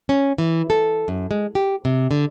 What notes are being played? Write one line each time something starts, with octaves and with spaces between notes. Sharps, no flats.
C#4
E3
A4
F#2
G#3
G4
C3
D3